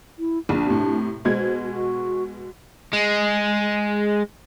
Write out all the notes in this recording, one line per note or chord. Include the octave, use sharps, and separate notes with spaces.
E4
A#1 D4
A2 C3
B2 G#3 C5 G#6
F#4
G#3